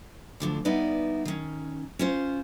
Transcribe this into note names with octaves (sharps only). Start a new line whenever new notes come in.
D2 D3 F3
G3 B3 D#4 E4 B4 D5
D#3 C#4
C#4 F4 C5